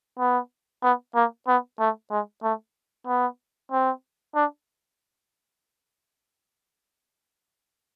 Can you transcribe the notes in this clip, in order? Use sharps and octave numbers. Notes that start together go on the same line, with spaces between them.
B3
B3
A#3
B3
A3
G#3
A3
B3
C4
D4